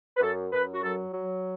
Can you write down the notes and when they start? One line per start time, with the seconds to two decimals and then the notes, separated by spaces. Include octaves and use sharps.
0.17 B4
0.21 F#2 A4
0.52 F#2 B4
0.72 F#4
0.83 F#3 A4
1.14 F#3